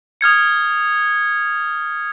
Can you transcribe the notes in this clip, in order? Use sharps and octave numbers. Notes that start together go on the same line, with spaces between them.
D#6 F6 G#6 C#7